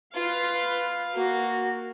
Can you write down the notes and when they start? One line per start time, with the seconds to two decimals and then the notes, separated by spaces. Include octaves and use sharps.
0.15 F4 B4 F5
1.14 A#3 F#4